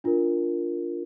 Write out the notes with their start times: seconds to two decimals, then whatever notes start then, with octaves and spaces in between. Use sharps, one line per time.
0.04 D4 F4 A#4